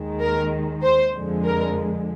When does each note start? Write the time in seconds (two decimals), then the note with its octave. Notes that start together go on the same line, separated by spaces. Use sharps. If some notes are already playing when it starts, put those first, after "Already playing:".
Already playing: D#2 D#3 G#3
0.20 A#4
0.82 C5
1.14 F2 D3 F3 G#3
1.44 A#4